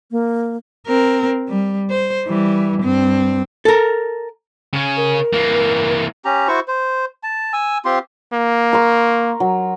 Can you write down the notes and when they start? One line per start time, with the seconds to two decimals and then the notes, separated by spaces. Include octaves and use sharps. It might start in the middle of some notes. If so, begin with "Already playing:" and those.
0.11 A#3
0.87 C4 A#4
1.49 G3
1.90 C5
2.26 E3 G3
2.83 G2 C4
3.65 A4 A#4
4.73 C#3 C#4
4.97 A#4
5.33 E3 A#3
6.25 C#4 G4 A#5
6.48 E4 F#4 C5 C#6
6.68 C5
7.23 A5
7.53 G#5 E6
7.85 C4 F4 G4 C6
8.33 A#3
8.73 A#4 C6 C#6
9.40 F#3